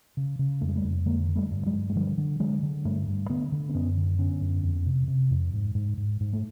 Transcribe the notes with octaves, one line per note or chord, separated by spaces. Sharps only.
C#3
C#3
F2 A3
G#3
G3 A3
F2
D3 G#3 A#3
D3
G3 A3
G2
F#3 G#3
G2
G#3
D3 F3 G3
D3
D3 F#3 G#3
D3
G2 G3 A3
G2
D3 A3 B3
D3
C4
F#2 B3 C#4
D3
D3 B3 C#4
F#2
F2
C3
C3
F2
G#2
G#2
G#2
G#2
A3